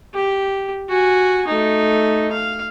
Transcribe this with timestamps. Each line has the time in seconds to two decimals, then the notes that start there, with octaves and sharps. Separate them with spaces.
0.14 G4
0.89 F#4 G#5
1.47 A3 D#4
2.32 F5